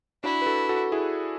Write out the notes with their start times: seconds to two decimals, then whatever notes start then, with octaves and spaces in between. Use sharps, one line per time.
0.24 D4 E4 F#4
0.42 B4
0.46 F#4 A4
0.69 F#4 A4
0.92 E4 G#4